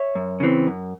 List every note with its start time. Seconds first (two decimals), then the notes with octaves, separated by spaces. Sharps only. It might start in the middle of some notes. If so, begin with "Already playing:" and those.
Already playing: C#5 E5
0.15 F#2
0.40 C#3 E3 C4
0.67 F#2